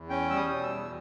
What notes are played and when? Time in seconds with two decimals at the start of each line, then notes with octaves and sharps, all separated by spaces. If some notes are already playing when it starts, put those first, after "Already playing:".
Already playing: E2
0.09 C#4 G5
0.29 G3 E6
0.36 D#6
0.50 B2
0.63 E6
0.70 E2